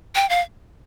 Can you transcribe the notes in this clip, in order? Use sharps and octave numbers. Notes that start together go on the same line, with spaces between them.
G5
F5